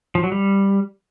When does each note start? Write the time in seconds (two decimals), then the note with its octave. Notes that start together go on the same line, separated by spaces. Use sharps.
0.15 F3
0.23 F#3
0.32 G3